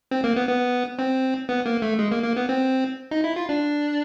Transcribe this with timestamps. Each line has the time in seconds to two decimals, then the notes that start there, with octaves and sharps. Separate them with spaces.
0.11 C4
0.24 A#3
0.36 B3
0.49 B3
0.99 C4
1.49 B3
1.66 A#3
1.82 A3
1.99 G#3
2.12 A#3
2.23 A#3
2.36 B3
2.49 C4
3.11 D#4
3.24 E4
3.36 F4
3.49 D4